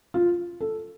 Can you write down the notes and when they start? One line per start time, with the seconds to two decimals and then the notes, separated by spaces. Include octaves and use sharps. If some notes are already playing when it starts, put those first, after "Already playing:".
0.14 F4
0.60 A4